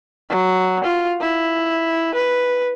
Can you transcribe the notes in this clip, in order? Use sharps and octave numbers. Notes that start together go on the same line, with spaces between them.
F#3
F4
E4
B4